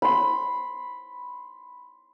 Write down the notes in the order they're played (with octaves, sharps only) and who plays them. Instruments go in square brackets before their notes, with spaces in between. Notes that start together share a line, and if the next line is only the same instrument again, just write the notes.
[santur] B5 C6